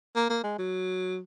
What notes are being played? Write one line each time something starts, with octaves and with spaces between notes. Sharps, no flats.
A#3
A#3
G#3
F#3